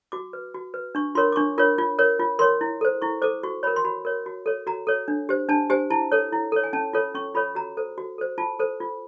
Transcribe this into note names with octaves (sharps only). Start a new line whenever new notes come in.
F#4 D6
B4
F#4
B4
D4 C#6
F4 A#4 C#5 C6
D6
D4 C#6
F4 A#4 C#5
F4
A#4 C#5
F4
A#4 C#5 C6
E4
A4 C5
E4 C#6
A4 C5 D6
F#4 C#6
A#4 C#5 B5
C6
F#4 B5
A#4 C#5
F#4
A4 C#5
F#4 A#5
A4 C#5
D4
G4 C5
D4 A5
G4 C5 G#5
E4 A5
A4 C#5
E4
A4 C#5
G#5
C#4 A5
F4 A4 C#5
C#4 C#6
F4 A4 C#5 B5
F#4 A#5
A4 C5
F#4
A4 C5
F4 A5
A4 C5
F4